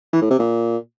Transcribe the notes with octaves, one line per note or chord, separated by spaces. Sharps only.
E3
A2
C3
A#2